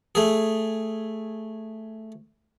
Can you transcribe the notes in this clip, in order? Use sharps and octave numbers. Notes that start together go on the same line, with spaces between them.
A3 G#4